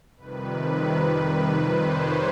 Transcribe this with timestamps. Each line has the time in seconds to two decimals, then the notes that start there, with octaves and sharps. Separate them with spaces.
0.17 F2 C3 D#3 G3 B4
1.31 B4
1.60 C5
1.88 C#5